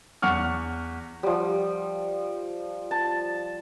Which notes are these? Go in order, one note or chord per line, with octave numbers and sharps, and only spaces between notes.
E2 F#5 C#6 F6
F3 G3
A5